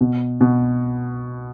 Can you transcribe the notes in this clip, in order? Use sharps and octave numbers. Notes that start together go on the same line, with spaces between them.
B2
B2